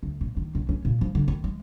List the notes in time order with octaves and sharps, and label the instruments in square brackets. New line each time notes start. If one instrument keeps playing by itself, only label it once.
[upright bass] D2
A#2
D#3
B1
C#4
A#2
F3
D3
D#3
G#3